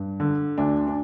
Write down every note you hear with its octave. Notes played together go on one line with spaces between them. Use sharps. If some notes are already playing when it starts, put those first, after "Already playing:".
Already playing: G2
D3
D2 D4
D4